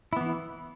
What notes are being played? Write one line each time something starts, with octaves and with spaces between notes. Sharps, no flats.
E3 B3 E4